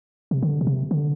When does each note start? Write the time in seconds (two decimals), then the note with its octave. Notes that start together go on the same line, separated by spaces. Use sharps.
0.31 C3
0.42 D3
0.61 B2
0.67 C3
0.91 D3